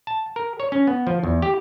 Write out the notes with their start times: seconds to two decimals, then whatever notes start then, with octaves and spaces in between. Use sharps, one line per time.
0.07 A5
0.36 A#4
0.60 C#5
0.72 C#4
0.87 B3
1.07 F3
1.23 E2
1.42 G4